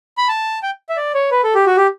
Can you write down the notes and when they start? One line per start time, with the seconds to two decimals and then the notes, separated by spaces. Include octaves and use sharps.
0.18 B5
0.28 A5
0.63 G5
0.89 E5
0.97 D5
1.14 C#5
1.31 B4
1.44 A4
1.55 G4
1.66 F#4
1.77 G4